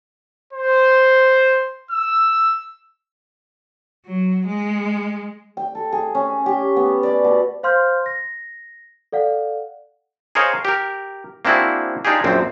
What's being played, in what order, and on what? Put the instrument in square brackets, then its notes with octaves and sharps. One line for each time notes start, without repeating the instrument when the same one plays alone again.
[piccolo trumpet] C5
E6
[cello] F#3
G#3
[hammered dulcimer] G5
A4
G#4
C#4
G4
B3
D5
B2
[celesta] C5 F5 C6 F6 G6
A#6
A4 D5 F5 F#5
[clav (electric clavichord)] G#4 A#4 C5 C#5 D#5 F5
G4 A#4
A#3 C4 D4 E4 F#4 G#4
D4 D#4 F4 G4 G#4
A#1 F#2 C4